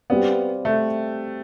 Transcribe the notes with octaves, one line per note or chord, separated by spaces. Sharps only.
G3 B3 C4 G4 D5 F5
A3